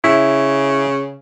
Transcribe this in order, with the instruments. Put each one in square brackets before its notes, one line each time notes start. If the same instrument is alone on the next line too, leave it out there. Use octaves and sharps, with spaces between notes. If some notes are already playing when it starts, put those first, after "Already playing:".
[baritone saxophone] C#3 [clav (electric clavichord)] E4